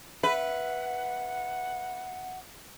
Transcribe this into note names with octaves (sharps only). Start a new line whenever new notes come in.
B4 E5 F#5